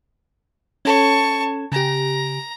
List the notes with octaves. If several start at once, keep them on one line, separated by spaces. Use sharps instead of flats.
C#4 A4 C#5 A5 C#6
C#3 G4 A#5